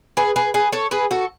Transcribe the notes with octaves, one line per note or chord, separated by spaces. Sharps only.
G#4 B4
G#4 B4
G#4 B4
A4 C#5
G#4 B4
F#4 A4